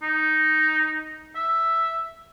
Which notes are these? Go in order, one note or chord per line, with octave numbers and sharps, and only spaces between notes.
D#4
E5